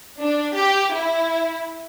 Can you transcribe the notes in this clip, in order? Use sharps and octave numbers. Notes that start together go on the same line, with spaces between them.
D4
G4
E4